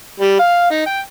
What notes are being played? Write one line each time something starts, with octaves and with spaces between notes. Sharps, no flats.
G3
F5
D#4
G5